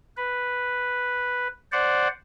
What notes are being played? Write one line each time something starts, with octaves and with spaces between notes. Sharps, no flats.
B4
C5 D5 F#5